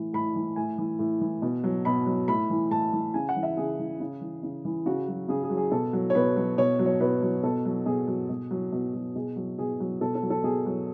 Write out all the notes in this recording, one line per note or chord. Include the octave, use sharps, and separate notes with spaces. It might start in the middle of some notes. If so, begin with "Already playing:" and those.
Already playing: A2 E3
A2 B5
E3
A2 G#5
E3
A2
E3
B2
F#3
B2 B5
F#3
A2 B5
E3
A2 A5
E3
C#3 G#5
F#5
E3
E5
C#3 G#4
E3
C#3
E3
C#3
E3
C#3 F#4
F#3
C#3 G#4
G#4
F#3
G#4
B2 A4
F#3
C#5
B2 B4
F#3
B2 C#5
F#3
C#5
B2 B4
F#3
B2 A4
F#3
B2 G#4
F#3
B2
F#3
B2
F#3
B2 G#4
F#3
B2 G#4
F#3
B2 A4
A4
F#3
A4
B2 G#4
F#3